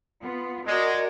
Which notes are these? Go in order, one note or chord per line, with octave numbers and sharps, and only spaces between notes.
B3 F4
G#3 F#4 A#4 D5 D#5